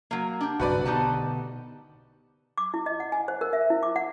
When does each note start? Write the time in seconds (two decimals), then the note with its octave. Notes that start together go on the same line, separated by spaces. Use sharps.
0.11 F#3 A#3
0.41 D4 G4
0.60 B1 G2 C#3 F#4 B4 D5
0.86 B2 D3 B3 D#4 G4 A5
2.58 D6
2.74 E4
2.86 D#5
3.00 F#5
3.12 G#5
3.28 C5
3.41 A#4
3.53 E5
3.70 E4
3.83 D6
3.96 F#5